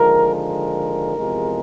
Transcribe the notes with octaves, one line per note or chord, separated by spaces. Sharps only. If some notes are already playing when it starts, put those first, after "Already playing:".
Already playing: D#2 D3 F3 G#3 A#4
A#4
E2 C3 F3 G#3